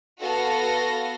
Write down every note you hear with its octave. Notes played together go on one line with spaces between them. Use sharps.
B3 F#4 A4 F5 A#6